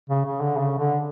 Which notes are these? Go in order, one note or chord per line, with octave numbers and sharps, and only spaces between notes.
C#3
C#3
D3
C#3
D3